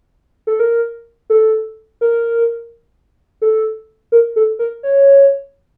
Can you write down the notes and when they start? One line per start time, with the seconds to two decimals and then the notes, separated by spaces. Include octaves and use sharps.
0.47 A4
0.60 A#4
1.30 A4
2.01 A#4
3.42 A4
4.12 A#4
4.36 A4
4.59 A#4
4.83 C#5